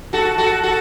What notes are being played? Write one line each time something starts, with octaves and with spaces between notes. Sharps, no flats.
F#4 A4
F#4 A4
F#4 A4